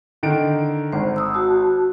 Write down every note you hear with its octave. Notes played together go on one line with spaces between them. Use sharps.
D3 D#3 D7
G#1 C5
D#6 E6
F#4 A5